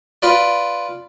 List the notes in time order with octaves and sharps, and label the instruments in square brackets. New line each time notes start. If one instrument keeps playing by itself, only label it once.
[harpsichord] F4 B4 D5